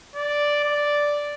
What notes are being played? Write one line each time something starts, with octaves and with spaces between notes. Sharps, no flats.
D5
D5